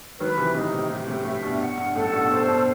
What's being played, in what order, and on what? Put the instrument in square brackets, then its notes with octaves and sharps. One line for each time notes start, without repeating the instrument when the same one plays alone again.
[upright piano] D#3 F#3 [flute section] B4
[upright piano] C3 E3
[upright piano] A2 C3 [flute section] D#4
[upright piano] A2 C3
[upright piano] A2 C3 [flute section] G4
[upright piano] A2 C3
[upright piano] A2 C3 [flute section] E5
[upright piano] G2 B2
[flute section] F#5
[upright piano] G2
[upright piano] F#2 A2 [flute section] A4
[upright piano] G2 B2
[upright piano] G2 B2 [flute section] C5
[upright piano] G2 B2